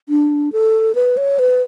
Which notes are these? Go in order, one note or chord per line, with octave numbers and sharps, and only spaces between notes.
D4
A4
B4
C#5
B4